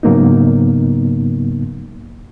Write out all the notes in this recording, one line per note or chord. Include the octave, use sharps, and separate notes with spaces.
G#2 C#3 F#3 A#3 B3 D#4